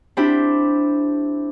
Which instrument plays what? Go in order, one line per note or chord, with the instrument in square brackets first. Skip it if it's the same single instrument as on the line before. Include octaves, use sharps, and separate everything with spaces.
[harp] C4 D4 E4 G4